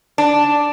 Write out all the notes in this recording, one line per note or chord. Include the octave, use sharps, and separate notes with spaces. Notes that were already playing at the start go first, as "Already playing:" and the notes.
D4